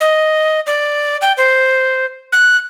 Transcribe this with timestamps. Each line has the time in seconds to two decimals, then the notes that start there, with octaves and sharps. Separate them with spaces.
0.01 D#5
0.67 D5
1.21 G5
1.37 C5
2.32 F#6